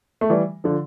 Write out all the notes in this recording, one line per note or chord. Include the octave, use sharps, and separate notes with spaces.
A3
E3 G3
D3 F3